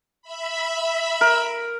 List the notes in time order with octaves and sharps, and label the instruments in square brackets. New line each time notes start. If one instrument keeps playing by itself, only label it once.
[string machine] E5 B5
[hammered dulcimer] A#4